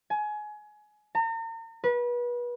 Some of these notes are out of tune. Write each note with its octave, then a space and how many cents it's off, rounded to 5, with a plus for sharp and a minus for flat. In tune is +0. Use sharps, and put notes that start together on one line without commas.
G#5 +25
A#5 -40
B4 -30